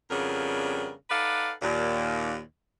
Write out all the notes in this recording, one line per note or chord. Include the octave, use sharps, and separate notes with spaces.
F2 C#3 G3 B3 D4 A#4
D#4 A4 B4 D5 F5 F#5
D#2 A#2